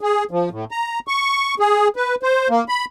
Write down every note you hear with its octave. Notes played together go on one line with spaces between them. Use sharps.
G#4
F3
A2
A#5
C#6
G#4
B4
C5
A#3
B5